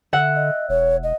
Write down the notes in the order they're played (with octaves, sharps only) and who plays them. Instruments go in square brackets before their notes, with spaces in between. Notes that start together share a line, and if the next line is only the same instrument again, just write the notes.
[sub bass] D3 [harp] E5 F#5
[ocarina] D#5
[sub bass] E1 [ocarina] C#5
[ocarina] D#5